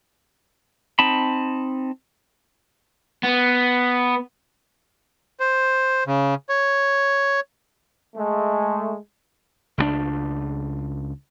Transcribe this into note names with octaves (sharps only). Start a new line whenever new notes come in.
C4 D#4 A5 B5
B3
C5
C#3
C#5
G#3 A3
C#2 F#3 D4